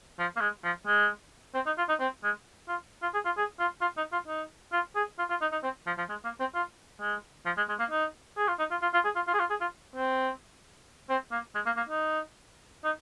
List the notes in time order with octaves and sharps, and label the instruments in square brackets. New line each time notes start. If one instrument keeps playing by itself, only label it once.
[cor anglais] F3
A#3
G#3
F3
G#3
C4
D#4
F4
D#4
C4
G#3
F4
F4
G#4
F4
G#4
F4
F4
D#4
F4
D#4
F4
G#4
F4
F4
D#4
D#4
C4
F3
F3
G#3
A#3
C4
F4
G#3
F3
G#3
G#3
A#3
D#4
G#4
F4
D#4
F4
F4
F4
G#4
F4
F4
G#4
F4
G#4
F4
C4
C4
A#3
G#3
A#3
A#3
D#4
D#4